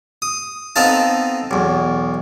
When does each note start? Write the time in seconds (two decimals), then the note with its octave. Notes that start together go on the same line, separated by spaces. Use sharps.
0.22 D#6
0.76 B3 C4 D#4 A4 F5 A5
1.51 B1 E2